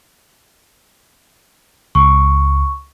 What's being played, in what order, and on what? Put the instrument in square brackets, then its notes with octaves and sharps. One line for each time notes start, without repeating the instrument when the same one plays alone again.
[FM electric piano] C#2 [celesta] C#6